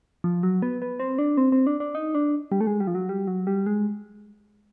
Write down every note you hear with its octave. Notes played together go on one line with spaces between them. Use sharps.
F3
F#3
B3
B3
C4
D4
C4
C4
D4
D4
D#4
D4
G3
A3
G#3
G3
F3
F#3
G3
F#3
G3
G#3